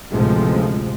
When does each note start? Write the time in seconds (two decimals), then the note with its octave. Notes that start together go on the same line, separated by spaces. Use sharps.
0.12 A1 D2 A2 C3 F3 G#3